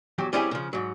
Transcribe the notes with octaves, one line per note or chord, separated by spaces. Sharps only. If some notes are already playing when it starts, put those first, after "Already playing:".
E2 F#3 G4
G3 C4 C#4 E4 G4 G#4
C#3 F3
G#2 F#3